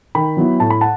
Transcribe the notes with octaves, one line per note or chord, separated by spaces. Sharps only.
D#3 G5 B5
F#3 B3 E4
A2 A5
B5
F#5 A5